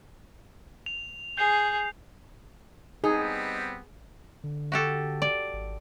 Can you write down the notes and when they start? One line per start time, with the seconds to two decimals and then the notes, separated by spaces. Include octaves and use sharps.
0.86 F7
1.37 G#4 G6 C7 F7
3.04 G3 B3 C4 D#4 G#4
4.44 D3
4.72 F#4 G4 A4
5.22 D5
5.53 G#1